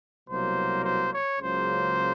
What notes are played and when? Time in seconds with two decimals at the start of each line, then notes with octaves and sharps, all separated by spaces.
0.28 C2 B2 F#3 A#3 C5
0.84 C5
1.12 C#5
1.40 C#2 C#3 F#3 A#3 C5